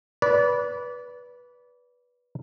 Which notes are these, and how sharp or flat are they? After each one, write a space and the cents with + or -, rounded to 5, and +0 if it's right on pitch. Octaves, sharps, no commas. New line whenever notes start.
B4 -15 D5 -30